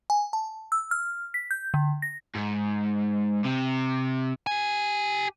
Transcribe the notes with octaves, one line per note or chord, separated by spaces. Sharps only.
G#5
A5
E6
F6
B6
G6
D3
A#6
G#2
C3
G4 G#5